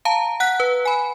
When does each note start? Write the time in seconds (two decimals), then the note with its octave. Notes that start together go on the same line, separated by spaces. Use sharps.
0.05 F5 A5 A#5
0.40 F#5 F#6 B6
0.60 B4
0.85 G#5 B5